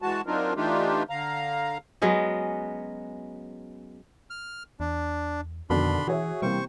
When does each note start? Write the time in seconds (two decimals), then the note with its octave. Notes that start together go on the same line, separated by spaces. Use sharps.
0.02 E3 G#3 F#4 A5
0.27 F#3 C4 D4 D#4 F4 A#4
0.56 E3 A3 D4 D#4 F4 G4
1.10 D3 F5 A#5
2.02 F#3 G#3 B3 C#4
4.30 F6
4.80 E2 D4
5.70 F2 B2 D3 D#3 D4 B5 C6
6.08 E3 F#4 G#4 C#5 E5
6.42 C3 E3 G3 A#3 C5 C#6